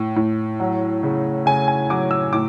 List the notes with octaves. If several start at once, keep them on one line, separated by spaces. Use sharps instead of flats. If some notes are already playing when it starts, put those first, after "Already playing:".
Already playing: A2
A2
F#3
C#3
C#3 G#5
G#5
F#3 D6
E6
A2 D6